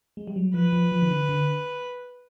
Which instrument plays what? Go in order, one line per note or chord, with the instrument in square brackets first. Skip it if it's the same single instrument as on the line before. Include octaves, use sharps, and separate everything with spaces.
[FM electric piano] G#3
G3
F#3
[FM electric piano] F3 [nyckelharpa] B4
[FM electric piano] F3
F3
D#3
D3
D3